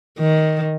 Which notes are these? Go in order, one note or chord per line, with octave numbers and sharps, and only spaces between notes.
D#3